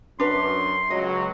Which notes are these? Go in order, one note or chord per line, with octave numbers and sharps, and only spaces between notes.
F#2 D4 B4 C6
C#2 F#3 D#5